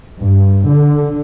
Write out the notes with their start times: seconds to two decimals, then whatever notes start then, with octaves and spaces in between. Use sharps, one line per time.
0.21 G2
0.69 D3